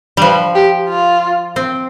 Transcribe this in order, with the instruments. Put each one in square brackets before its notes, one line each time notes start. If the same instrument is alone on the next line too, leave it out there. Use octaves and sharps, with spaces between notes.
[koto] F3 G3 [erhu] B4
[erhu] G4
F4
[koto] C4